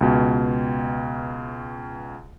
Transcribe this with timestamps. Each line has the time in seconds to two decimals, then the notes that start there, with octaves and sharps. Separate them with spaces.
0.01 C#2 B2